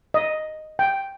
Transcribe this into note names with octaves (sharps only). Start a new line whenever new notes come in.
D#5
G5